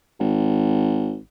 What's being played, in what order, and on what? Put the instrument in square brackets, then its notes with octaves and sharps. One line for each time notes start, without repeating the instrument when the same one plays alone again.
[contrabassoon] G#1